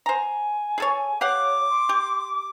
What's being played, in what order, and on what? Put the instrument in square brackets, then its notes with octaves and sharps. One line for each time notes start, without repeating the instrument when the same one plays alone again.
[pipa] C5 A#5 [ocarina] G#5
[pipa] G#4 A4 C#5
[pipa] G4 F5 F#5 [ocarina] C#5 [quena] D6
[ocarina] C6
[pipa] G4